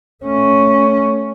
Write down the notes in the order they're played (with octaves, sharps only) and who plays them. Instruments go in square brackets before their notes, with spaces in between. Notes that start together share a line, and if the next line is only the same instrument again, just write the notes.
[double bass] A3 C#4